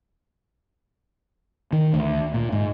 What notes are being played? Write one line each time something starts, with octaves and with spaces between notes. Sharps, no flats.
D#3
D2
A#2
G#2